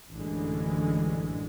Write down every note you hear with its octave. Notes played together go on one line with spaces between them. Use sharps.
A1 F#2 D3 E3 G#3